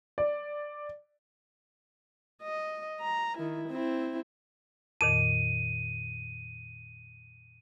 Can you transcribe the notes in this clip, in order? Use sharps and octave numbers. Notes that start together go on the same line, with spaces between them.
D5
D#5
A#5
D#3 E4
C4 E4
F2 A#2 D#3 D#7